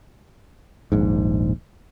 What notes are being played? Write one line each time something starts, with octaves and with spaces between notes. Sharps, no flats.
D#1 A#1 G#2